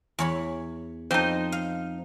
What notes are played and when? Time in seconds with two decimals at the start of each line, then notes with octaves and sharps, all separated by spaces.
0.19 E2 C#5 B5
1.11 F2 D#4 C5 A5
1.52 F5